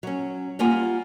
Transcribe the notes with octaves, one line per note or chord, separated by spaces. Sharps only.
F#3 C#4
G3 A#3 F4 F#5 G#5